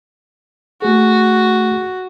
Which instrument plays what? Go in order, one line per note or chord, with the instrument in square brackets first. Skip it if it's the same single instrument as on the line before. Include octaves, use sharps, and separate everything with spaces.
[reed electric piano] A3 G#4 [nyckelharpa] F#4